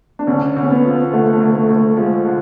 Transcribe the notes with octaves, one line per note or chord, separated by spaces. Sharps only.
D4
D2 C#4
D2
C#4
B3
F3
D3 A3
A3
D2
A3
D2
A3
F3 G#3
D3